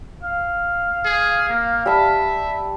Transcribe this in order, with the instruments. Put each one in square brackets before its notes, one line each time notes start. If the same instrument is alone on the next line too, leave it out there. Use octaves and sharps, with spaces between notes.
[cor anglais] F5
[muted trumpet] G#4
A#3
[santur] G3 A5 [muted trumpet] E5